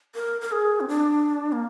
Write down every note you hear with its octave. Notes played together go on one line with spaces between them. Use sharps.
A#4
A#4
G#4
C4
D4
A#3